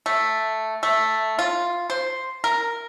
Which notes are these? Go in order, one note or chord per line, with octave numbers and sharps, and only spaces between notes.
A3
A3
F4
C5
A#4